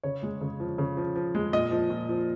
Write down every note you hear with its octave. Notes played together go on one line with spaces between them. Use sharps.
C#3 C#5
G#3
C#3
F3
C#3
F3
F3
G#3
A#2 D#5
F3
A#2
F3